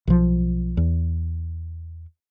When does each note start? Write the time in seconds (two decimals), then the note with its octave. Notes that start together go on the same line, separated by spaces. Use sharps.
0.07 B1 F3
0.77 E2